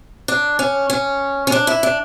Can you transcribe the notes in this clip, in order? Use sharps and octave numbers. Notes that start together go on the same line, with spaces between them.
D4
C#4
C#4
C#4
D4
E4
D4